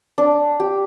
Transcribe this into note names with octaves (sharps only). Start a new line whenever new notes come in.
D4
G4